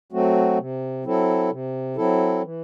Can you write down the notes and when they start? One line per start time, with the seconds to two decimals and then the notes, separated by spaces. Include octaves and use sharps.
0.12 F#3 A3 C4 F#4
0.58 C3
1.04 F#3 C4 E4 A4
1.51 C3
1.96 F#3 C4 E4 A4
2.42 E3